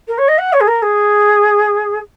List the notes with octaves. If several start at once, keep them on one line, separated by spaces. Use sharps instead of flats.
A#4
C#5
D#5
F#5
C#5
G#4
A#4
G#4